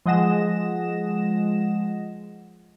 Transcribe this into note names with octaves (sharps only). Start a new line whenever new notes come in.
F3 G#3 D#5 F#5 A#6 E7